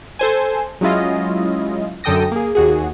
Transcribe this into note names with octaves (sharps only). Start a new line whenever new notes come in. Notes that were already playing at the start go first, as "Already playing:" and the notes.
A4 C5 G#5
F#3 G#3 C#4 E4 F4 D#5
F#2 D3 A4 G5 D#6 A#6
A#3 G#4
D#2 F#4 G#4